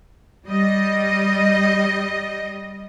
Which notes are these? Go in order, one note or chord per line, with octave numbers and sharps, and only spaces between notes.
G3 D#5